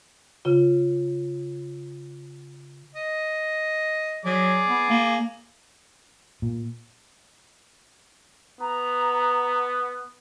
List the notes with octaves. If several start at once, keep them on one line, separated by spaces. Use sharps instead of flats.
C#3 F4
D#5
F#3 G#4 D5
B3
A#3
A#2
B3 A#5